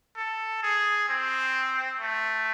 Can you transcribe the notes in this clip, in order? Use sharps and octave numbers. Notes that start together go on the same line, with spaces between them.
A4
G#4
C4
A3